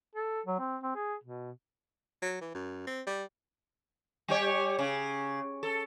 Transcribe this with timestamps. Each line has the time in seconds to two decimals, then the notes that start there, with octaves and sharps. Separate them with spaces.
0.16 A4
0.46 F#3
0.59 C4
0.83 C4
0.95 G#4
1.24 B2
2.22 F#3
2.41 E3
2.54 F#2
2.87 C4
3.07 G3
4.28 G3 G4 C#5
4.79 C#3
5.63 A4